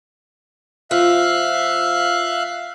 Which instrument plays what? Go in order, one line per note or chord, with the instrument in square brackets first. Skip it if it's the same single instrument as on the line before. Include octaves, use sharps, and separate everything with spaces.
[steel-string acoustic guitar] F3 [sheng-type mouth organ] E5 F5 F#6